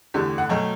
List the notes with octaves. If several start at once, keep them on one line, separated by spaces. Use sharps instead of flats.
E2 D3 A3 G4
F#5
B2 F#3 A3 G5